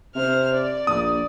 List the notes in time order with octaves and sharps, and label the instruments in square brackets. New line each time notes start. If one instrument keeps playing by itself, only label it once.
[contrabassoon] C3 [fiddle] C5 F6
[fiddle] D5
[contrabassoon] A#1 [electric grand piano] D#6